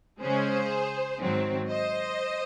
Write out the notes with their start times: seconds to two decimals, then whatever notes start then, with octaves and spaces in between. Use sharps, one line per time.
0.20 C#3 G#3 C#4 G#4 C5
1.20 G#2 D#3 F#3 C4
1.70 C5 D#5